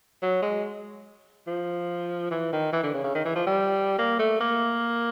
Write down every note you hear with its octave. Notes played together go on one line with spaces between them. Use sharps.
F#3
G#3
F3
E3
D#3
E3
D3
C#3
C#3
D#3
E3
F3
G3
A#3
A3
A#3